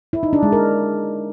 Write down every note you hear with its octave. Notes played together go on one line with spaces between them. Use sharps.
E4
D#4
D4
G#3
A#4